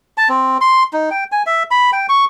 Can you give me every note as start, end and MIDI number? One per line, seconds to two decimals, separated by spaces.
0.18 0.28 81
0.29 0.58 60
0.61 0.83 84
0.93 1.10 63
1.11 1.24 79
1.32 1.43 80
1.46 1.63 76
1.71 1.91 83
1.93 2.07 79
2.09 2.25 85